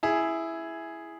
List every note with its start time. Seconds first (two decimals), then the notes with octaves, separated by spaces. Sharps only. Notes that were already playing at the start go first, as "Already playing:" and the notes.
0.03 E4 G#4